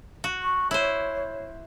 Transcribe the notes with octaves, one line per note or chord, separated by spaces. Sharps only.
F#4
C#6
E4 C5 C#5